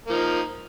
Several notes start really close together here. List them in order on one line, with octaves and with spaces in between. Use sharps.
A#3 F3 D#4